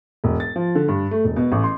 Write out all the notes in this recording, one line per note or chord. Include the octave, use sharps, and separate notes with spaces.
E1
A6
F3
D3
G2
A3
E1
B2
A1
C6